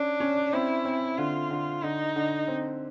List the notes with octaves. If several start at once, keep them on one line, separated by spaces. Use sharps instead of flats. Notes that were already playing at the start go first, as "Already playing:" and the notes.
Already playing: C#4 D4
C#4
C4 E4
C4
D3 F4
D3
D3 D#4
D3
C4